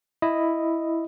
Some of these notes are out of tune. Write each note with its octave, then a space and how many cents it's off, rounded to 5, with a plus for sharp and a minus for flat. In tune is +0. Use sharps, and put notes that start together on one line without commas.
E4 +0 D#5 +0